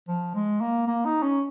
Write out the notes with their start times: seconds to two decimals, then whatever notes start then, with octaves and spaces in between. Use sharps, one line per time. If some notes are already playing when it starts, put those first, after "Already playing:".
0.08 F3
0.34 G#3
0.61 A#3
0.87 A#3
1.05 D#4
1.23 C#4